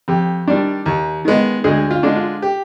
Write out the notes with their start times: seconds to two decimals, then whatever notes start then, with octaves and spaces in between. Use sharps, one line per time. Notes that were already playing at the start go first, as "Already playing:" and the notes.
0.08 F2 G4
0.48 D#3 G3 D4
0.86 D#2
1.25 D#3 G#3 B3
1.64 D2 G#3 G#4
1.91 F4
2.03 D3 G#3 D4
2.16 F4
2.42 G4